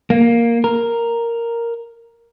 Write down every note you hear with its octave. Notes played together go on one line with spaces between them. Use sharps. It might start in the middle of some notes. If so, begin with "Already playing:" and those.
A#3
A#4